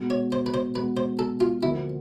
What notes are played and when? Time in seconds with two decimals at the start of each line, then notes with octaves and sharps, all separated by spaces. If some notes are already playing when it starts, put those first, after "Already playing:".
Already playing: B2 G#3 B3
0.10 C#5
0.32 C5
0.46 B4
0.54 C5
0.75 B2 G#3 B3 B4
0.97 C5
1.19 A4
1.40 F4
1.62 D2 D3 F3 A#3 E4